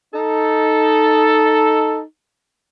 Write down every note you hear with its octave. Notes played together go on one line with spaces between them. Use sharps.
D#4 A4